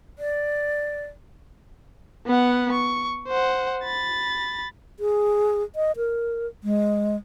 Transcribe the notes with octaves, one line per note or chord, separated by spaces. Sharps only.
D5
B3 F#5
C#6
C5 F#5
B5 A6
G#4
D#5
A#4
G#3